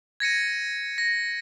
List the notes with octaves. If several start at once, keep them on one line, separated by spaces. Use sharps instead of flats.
G#6 A#6 C#7 D#7
A#6